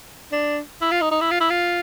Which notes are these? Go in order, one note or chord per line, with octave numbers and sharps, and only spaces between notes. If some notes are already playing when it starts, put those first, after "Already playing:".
D4
E4
F4
D#4
D#4
E4
F4
E4
F4